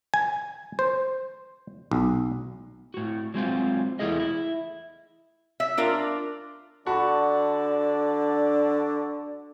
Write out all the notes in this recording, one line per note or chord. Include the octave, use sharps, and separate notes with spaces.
G#5
C5
B1
A2 F#4
F#3 G#3 C4 F4
E2 A3 E4 G#4 D#5
E4
E5
D4 F4 A#4
D3 D4 F#4 D5 A5 B5